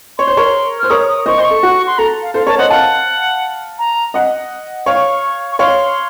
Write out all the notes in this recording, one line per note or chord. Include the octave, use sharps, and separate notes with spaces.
C#5 C6
C5
A#4 C#5
C5 F6
A#4 C#5 D#6
D#6
C5 D#5 C#6
C5 D#5 C6
C#6
A4
F#4
C6
A4 A#5
F5
A4 C5 F5
A#4 C#5 A5
C5 D#5 F#5
F5 F#5 A5
A#5
D#5 F#5
C#5 F5 C#6
C#6
C#5 F5 C6